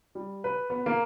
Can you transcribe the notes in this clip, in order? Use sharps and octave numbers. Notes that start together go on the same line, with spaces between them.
G3
B4
B3
A#3